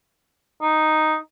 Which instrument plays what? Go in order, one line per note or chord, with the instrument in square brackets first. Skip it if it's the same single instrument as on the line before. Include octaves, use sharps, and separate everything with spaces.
[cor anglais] D#4